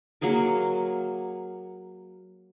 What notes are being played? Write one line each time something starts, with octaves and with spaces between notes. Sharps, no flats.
F#3 A#3 G#4 A#4